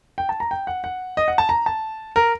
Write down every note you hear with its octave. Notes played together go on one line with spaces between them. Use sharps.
G5
A5
A#5
G5
F#5
F#5
D#5
F#5
A5
A#5
A5
A#4